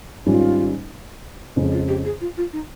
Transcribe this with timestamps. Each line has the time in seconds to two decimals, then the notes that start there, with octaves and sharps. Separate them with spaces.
0.26 G#1 G#2 G3 C#4 F4
1.56 F2 C#3 G#3
1.72 F4
1.88 G4
2.05 G#4
2.21 F4
2.37 F4
2.53 D#4